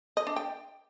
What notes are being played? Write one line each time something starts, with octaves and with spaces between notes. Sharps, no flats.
D#5
D4
G5